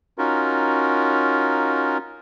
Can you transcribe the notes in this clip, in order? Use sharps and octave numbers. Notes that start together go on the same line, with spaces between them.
C#4 D#4 F4 F#4 A#4